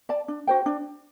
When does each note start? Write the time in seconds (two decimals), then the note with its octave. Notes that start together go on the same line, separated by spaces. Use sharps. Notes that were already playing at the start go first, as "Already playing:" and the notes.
0.09 D5 A5
0.28 D4
0.47 F#4 C5 G5
0.66 D4